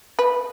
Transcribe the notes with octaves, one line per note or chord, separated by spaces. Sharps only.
B4